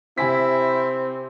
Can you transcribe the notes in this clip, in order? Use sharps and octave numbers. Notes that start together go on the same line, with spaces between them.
C3 C4 E4 G#5 B6